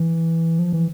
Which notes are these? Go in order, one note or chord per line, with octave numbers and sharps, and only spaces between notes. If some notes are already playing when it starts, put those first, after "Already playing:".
Already playing: E3
F3
E3